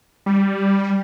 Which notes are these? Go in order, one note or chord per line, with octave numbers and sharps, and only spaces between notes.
G3